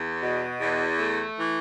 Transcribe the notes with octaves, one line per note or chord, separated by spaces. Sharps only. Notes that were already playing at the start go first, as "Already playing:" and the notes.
Already playing: E2
B2
E2
A3
E3